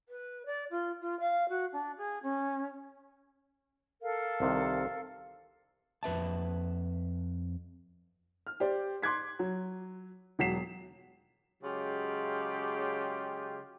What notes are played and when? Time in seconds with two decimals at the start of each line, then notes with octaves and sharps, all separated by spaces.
0.09 B4
0.46 D5
0.71 F4
1.01 F4
1.20 F5
1.49 F#4
1.73 D4
1.98 G#4
2.23 C#4
4.01 A4 A#4 F5
4.40 C2 C3 D#3
6.03 F2 B4 E5 A5
8.47 F6
8.60 G4 C5 D5
9.02 C6 D6 F#6 G#6 B6
9.39 F#3
10.39 E1 F#3 F#5 B6 C7 E7
11.63 C#3 F#3 G#3 F4 G4